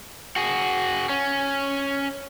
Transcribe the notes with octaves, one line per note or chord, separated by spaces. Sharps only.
F#4 G#4
C#4